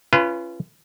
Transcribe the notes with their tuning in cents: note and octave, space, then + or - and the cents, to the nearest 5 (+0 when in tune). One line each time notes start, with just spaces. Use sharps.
C#4 +0 F4 -30 B4 +5